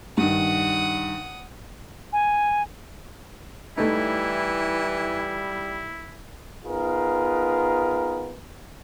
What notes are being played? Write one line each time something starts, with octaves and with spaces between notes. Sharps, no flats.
G2 D#3 F#5 D#6
G#5
E3 G3 A3 D#4 E4
B3 D#4 F4 G#4 A#4 B4